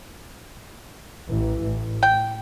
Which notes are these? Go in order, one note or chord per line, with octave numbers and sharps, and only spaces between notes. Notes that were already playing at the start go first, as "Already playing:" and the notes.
A1 E3
A1
G5